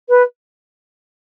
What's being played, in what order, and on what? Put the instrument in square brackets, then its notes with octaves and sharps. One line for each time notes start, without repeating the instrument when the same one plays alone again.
[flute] B4